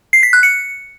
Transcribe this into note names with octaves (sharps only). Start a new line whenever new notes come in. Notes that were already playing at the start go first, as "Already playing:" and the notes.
C7
B6
F#6
C#7